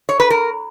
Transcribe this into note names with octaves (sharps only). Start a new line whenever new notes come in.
C#5
B4
A#4